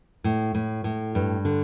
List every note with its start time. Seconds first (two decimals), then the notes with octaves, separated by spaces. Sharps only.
0.24 A2
0.55 A2
0.84 A2
1.15 G2
1.45 D3